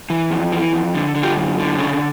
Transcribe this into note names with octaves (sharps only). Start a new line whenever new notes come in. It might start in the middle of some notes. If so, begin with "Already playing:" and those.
E3
F2
E3
F2
D3
D3
F4 G4
F#2
D3
C#3